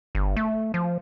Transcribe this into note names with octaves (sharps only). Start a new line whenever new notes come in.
G1
A3
F3